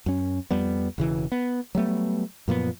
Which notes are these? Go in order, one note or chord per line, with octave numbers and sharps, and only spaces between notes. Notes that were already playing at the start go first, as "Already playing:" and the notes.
F#2 C#4
F2 G3 B3
E1 C#3 E3
B3
F#3 G3 A3 B3
F#2 A#2 F3 B3